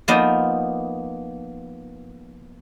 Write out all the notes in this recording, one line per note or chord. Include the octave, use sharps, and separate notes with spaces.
F3 A#3 B3 D#4 D#5